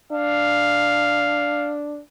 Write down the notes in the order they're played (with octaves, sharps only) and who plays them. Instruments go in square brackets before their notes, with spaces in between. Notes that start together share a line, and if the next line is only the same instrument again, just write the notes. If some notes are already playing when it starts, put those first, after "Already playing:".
[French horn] D4 [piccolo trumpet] F5